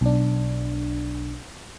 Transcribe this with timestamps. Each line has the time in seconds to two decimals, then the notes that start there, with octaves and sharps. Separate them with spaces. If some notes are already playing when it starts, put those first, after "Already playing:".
0.01 B1 D4